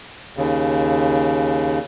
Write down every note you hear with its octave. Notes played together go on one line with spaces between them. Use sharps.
D#2 C#3